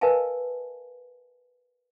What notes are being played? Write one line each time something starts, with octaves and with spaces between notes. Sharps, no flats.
A#4 B4 D#5 F5 G#5 A5